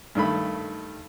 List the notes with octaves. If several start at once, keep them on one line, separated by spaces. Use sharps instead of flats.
G2 D#3 A3 B5